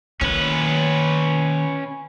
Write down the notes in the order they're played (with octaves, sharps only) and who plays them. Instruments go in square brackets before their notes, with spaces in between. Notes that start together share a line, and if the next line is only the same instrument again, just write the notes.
[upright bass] D#3 A#3 [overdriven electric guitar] C#4 B4